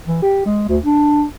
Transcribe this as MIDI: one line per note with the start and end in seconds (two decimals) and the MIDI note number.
0.07 0.19 52
0.22 0.44 67
0.46 0.64 56
0.68 0.78 38
0.84 1.24 62